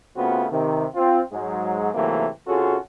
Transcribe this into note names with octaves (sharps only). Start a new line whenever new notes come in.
C#3 A3 B3 C4 F4 F#4
C3 D#3
C4 F4
G#2 F#3 G#3
G#2 C3 E3 F#3 A3 A#3
C3 C#4 F4 F#4 G#4 A4